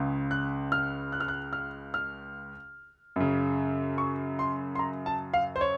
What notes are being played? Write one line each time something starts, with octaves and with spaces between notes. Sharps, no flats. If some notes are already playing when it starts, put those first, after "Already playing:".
Already playing: C#2 C#3
F#6
F6
F#6
F6
F#6
F6
F6
F#2 C#3
C#6
C6
C6
A#5
A5
F5
C5
C#5